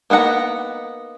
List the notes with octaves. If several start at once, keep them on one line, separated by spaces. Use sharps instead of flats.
A#3 B3 D#4 F#5 A#5